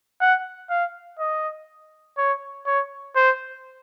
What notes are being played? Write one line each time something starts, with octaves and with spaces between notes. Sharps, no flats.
F#5
F5
D#5
C#5
C#5
C5